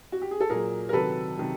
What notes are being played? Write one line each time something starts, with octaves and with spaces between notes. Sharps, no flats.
F#4
G4
G#4
A4
A#2 F#3 G#4 A#4
A#4
C3 D#3 F#3 A4 B4
C3 D#3 F#3